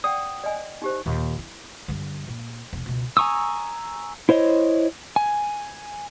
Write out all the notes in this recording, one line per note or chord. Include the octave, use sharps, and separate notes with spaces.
D5 F#5 G5 D#6
D5 D#5 G#5
D#4 G4 C5
D#2 A#2
E4
G2 D3
A#2
E1
C#2 B2
G#5 A#5 C#6 D#6 E6
E4 C5 C#5 D#5
G#5